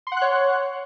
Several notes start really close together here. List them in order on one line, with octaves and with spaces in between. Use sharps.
C6 F#5 F#6 C#5